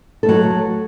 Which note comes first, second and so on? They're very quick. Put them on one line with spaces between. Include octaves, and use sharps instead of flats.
A4 A3 F#3